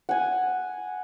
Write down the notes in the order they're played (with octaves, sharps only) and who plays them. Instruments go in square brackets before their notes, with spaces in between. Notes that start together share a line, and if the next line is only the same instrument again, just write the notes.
[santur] F#5 G#5